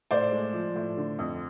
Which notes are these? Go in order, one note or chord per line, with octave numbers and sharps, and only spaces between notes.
A2 C5 D5
G#3
F3
A2
D3
F2